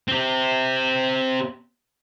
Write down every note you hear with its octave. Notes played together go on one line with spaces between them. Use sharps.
C4 G4